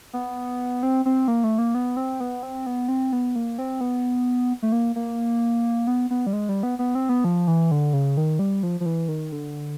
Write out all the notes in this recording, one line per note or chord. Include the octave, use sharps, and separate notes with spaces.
B3
C4
C4
A#3
A3
A#3
B3
C4
B3
C4
B3
C4
B3
A#3
C4
B3
A3
A#3
A#3
B3
B3
G3
G#3
G3
B3
B3
C4
B3
F3
E3
D3
C#3
D#3
G3
F3
F3
E3
D#3
D3